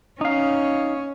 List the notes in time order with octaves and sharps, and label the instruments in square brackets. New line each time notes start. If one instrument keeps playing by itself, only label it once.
[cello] C#4 [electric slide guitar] D#4 F5